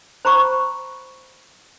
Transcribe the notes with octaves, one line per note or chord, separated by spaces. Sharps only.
C5 A#5 B5 C#6